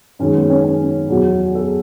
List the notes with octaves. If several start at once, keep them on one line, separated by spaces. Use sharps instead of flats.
F#2 D#3 G#3 C#4
B3
C#4
C#4
E2 B2 F#3
A4